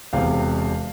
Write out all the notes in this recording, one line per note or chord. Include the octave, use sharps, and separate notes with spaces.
E1 E2 C3 F5